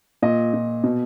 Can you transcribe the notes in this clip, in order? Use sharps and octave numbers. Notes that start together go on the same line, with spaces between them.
A#2 D#5
A#2
B2